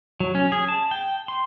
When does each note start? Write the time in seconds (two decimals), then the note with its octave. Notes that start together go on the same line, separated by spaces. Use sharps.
0.20 F#3
0.35 C#4
0.52 G#4
0.68 A5
0.91 G5
1.28 C6